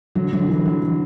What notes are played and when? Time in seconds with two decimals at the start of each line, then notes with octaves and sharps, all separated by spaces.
0.15 D3 F#3
0.33 D3 F#3
0.49 E3
0.65 D3 F#3
0.82 D3